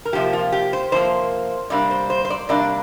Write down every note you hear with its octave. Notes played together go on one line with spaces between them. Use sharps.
A#4
C3 F3 A#3 G4
F4
G4
C5
C3 F3 A#3 C5
C3 G3 A#3 D4 D5
C5
C5
C5
D5
C3 G3 A#3 D4 D5